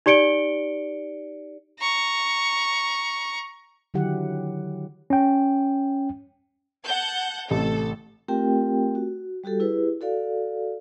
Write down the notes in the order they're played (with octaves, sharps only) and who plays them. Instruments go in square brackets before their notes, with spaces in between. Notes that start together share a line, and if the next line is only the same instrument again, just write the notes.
[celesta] D#4 G4 D5 C#7 D7 G7
[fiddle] A#5 C#6
[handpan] D3 D#3 F#3 E4 G4 F#5
[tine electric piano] C#4 G5
[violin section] F#5 A5 G6
[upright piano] A1 C3 A3 [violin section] A4
[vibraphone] A3 C4 F4 G4 A#4 G5
F#4
G3 F#4 G4 A4
E4 G4 G#4 B4
F#4 A4 D5 F5